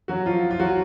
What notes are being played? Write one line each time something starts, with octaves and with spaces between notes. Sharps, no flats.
F#3 F#4
F3 F4
F4
F#3 F#4